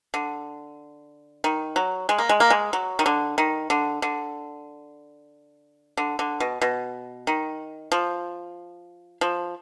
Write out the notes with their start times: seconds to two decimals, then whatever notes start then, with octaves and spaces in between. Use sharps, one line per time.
0.14 D3
1.44 D#3
1.76 F#3
2.09 G#3
2.18 A#3
2.29 G#3
2.40 A#3
2.50 G#3
2.73 F#3
2.99 D#3
3.06 D3
3.38 D#3
3.70 D3
4.02 D3
5.97 D3
6.19 D3
6.40 B2
6.61 B2
7.27 D#3
7.92 F3
9.21 F3